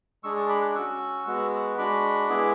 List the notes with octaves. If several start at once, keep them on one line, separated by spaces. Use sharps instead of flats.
G#3 D4 G#4 C#6 E6
A5 C#6
B5 D6
D6 F#6
C#4 F#4 C#6 E6
G#3 B3 F#4
G#3 D4 F#4 B5 D6
G#3 B3 E4 G#4